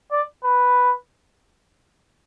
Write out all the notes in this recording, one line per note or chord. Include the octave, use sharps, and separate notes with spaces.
D5
B4